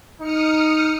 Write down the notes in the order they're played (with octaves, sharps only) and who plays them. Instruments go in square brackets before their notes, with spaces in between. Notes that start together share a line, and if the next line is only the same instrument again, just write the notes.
[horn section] D#4 [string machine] D#6 F6 C#7